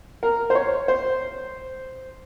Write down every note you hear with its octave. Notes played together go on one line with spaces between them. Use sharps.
A#4
C5
C#5
C5